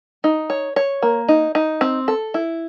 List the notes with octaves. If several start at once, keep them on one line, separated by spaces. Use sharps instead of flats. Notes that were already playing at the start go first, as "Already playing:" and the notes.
D#4
C#5
C#5
A#3
D#4
D#4
C4
A4
E4